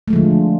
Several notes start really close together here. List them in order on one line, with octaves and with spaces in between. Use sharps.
A3 G#3 F3 D3